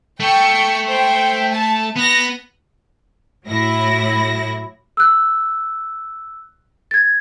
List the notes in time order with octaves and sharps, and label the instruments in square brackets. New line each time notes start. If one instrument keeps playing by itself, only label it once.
[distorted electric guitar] A3 [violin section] G5 C#6 C#7
[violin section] C5 G5
A5
[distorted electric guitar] B3 [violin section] F#6 A#6
[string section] A2 F#3 E4 A#6
[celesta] E6 F#6
G#6 A6